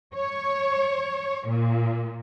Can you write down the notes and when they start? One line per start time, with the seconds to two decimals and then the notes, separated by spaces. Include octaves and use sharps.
0.16 C#5
1.49 A#2